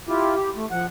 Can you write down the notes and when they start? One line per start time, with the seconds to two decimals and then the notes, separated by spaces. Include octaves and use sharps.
0.08 E4 F4 G4
0.36 G4
0.56 A3
0.71 F3 F#5